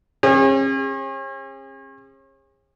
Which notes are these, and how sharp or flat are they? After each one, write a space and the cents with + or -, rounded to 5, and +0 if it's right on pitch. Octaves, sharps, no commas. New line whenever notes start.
C#4 -40 G#4 -40